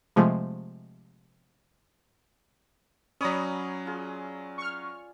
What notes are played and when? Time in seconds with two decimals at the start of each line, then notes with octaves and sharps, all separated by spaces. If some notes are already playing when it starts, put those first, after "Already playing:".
0.16 C3 F3 G#3 A3
3.21 F#3 C#4 C#5 D5 A#5 B5 D#6
3.86 F4 G#4
4.58 C#6 F6